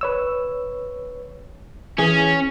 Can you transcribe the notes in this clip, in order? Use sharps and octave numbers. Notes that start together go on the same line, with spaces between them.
B4 C#5 E6
E3 C#4 G#4